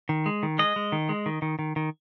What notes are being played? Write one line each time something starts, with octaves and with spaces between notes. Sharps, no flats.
D#3
G#3
D#3
G#3 D#5
G#3
D#3
G#3
D#3
D#3
D#3
D#3